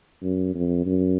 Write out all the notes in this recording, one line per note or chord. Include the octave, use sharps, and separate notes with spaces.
F#2
F2
F#2